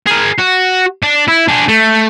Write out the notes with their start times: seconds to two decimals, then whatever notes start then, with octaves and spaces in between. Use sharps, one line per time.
0.07 G#4 A#4
0.39 F#4
1.03 D4
1.28 E4
1.48 D4 G#4
1.68 A3